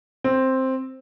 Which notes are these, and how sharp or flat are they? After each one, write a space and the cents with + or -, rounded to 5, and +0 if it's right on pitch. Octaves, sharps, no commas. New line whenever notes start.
C4 +5